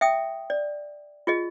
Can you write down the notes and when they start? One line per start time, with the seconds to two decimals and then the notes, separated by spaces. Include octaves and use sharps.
0.01 E5 G5 D#6
0.50 D5
1.27 F4 G#4 D#5